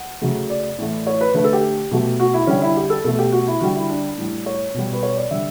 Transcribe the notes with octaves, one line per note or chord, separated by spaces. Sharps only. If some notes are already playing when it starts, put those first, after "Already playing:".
Already playing: F#5
C#3 F#3 A3
D5
A2 E3 A3
C#5
B4
D3 A3 B4
A4
G4
B2 F#3 A3
F#4
E4
D3 G3 C#4
E4
G4
A4
B2 A3 A4
G4
F#4
E4
D3 G3 F#4
E4
D4
A2 G3
C#5
B2 G3
B4
C#5
D5
D3 G3 E5